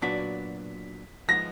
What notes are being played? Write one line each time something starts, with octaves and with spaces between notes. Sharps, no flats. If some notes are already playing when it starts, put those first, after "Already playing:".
A#2 F#3 B3 D4 F#4 B6
F3 G#3 B3 A#6